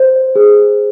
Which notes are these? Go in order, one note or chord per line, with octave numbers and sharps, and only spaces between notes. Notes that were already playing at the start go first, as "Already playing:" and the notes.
Already playing: C5
G#4